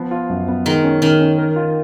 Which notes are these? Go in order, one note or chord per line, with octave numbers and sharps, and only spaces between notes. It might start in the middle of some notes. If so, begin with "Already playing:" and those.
Already playing: F3 B3
F4
F#2
B3
D#3 G#3
C#4
D#3 C#4
C#4
A#4
F4